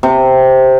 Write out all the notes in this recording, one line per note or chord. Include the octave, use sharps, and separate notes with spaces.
C3